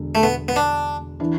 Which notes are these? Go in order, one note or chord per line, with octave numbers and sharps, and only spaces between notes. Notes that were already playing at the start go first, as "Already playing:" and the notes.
Already playing: E1 D3
A3
B3
B3
D4
E3 D4